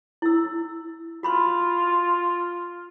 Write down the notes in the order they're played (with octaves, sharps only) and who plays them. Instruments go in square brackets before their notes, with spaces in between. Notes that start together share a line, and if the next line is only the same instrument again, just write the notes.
[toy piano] E4 E6
[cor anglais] F4 [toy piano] F#4 B5 C6